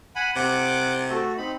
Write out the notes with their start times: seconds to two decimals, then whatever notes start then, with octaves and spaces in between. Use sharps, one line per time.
0.16 F#5 G#5 B5
0.36 C3 F#5 D6
1.10 A3 F#4 A4
1.38 C4 D#4 B5